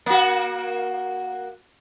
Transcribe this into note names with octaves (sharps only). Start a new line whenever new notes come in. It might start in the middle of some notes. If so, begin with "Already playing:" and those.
A#3 F#4